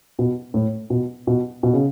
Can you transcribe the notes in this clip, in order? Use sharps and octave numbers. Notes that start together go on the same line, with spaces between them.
B2
A2
B2
B2
B2
C#3